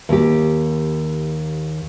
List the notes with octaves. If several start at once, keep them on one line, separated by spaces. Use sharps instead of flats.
D#2 G4